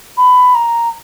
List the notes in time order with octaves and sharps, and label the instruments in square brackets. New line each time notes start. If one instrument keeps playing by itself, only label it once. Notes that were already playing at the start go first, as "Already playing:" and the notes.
[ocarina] B5
A#5